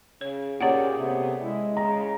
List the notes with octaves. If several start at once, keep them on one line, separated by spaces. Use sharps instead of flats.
C#3 C#5
A#2 C#4 G4 G#4 C#5 D5 F#5
C3 A3 B3
G#3 E4
C#3 A#5